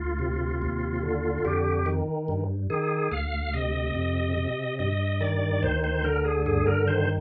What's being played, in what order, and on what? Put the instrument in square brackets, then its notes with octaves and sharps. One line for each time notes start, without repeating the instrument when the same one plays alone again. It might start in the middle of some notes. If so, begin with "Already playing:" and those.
Already playing: [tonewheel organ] D2 F4
C3
D#2
D3
F2 G4
D#3
G2
D#3 G#4
D2 F5
C3 D#5
F2
C3
G2 D#5
D#3 D5
D2 C5
C5
D3 A#4
G#4
G2 G#4
A#4
D#3 C5